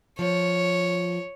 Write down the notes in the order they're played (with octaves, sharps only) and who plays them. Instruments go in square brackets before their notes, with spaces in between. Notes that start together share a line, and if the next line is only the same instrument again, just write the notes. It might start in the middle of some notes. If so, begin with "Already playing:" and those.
[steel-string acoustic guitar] F3 [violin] C#5